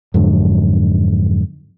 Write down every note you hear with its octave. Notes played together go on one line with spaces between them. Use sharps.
F2 G#2 D3 F#3